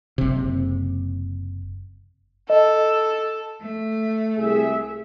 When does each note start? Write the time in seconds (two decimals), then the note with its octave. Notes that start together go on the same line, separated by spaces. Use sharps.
0.18 F#1 C3
2.50 A4 D#5
3.61 A3
4.37 C2 G#4 E5